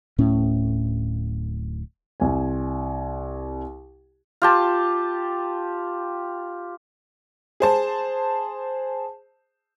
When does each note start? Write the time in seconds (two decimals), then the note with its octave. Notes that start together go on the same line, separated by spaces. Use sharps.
0.18 D1 A2 C#4
2.20 C2 G#5
4.42 F4 G4 A5
7.60 G#4 C5 A5